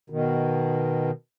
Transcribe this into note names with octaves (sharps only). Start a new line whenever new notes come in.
B2 D#3